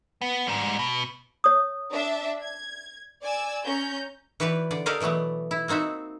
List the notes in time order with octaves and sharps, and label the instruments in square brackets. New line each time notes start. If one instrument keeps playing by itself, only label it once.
[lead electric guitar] B3
G#2 G3
B2
[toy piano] C#5 D#6
[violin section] D4 E5
G#6
D5 G#5 E6
C#4 A#5 G6
[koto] E3 F#4 G4 B4 D5
D3 D5
G4 A4 A#4 D5 D#5 F5
B2 E3 F#3 A3 B3
E4
A#3 C4 D#4 F#4 E5